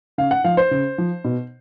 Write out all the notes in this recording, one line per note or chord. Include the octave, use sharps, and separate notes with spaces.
C#3 F5
F#5
F3 F5
C5
C#3
F3
B2